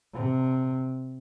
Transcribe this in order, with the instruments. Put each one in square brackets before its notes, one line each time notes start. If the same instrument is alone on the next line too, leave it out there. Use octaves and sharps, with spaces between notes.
[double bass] C3